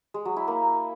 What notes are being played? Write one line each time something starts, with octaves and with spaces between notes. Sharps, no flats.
G#3
F#3
E4
A#3